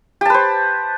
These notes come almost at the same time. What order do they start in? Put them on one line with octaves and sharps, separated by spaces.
G4 A5 B4 C5